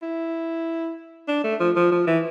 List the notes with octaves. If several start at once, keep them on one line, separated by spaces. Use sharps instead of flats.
E4
D4
A3
F3
F3
F3
E3